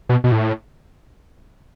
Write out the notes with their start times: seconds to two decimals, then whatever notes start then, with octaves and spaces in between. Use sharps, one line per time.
0.09 B2
0.24 B2
0.32 A2